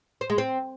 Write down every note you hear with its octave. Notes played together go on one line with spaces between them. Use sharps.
C5
G#3
C4